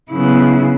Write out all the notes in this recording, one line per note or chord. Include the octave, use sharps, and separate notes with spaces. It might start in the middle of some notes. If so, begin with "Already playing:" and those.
C#3 F#3 B3 E4